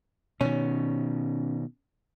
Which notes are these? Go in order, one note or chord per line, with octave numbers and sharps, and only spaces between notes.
B2 D#3 C#4